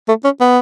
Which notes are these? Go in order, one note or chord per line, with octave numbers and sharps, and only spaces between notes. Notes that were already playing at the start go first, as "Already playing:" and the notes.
A3
C#4
B3